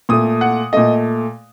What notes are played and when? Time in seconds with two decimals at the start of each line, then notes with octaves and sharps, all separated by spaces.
0.09 A#2 A3 D#6
0.41 F#5
0.73 A#2 A3 D#5